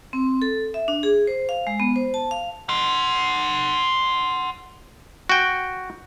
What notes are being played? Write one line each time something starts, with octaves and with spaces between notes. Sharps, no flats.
C4
A4
E5
D4
G#4
C5
F5
G#3
B3
C5
A5
F5
F#5 C6
F#4 G5